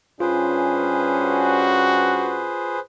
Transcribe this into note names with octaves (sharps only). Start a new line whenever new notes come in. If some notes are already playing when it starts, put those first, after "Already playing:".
G2 C#4 F4 G#4 B4 C5
F#4